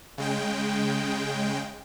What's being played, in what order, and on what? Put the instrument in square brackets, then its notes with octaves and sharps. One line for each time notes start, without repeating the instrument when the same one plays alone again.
[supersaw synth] C#3 G#3 G5